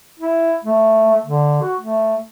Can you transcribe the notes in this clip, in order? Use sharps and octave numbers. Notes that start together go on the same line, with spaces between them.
E4
A3
D3
F#4
A3